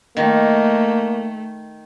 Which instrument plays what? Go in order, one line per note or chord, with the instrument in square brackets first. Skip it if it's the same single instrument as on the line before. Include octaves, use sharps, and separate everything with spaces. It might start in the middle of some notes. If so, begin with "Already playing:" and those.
[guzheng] D#3 [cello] A3 [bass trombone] A#3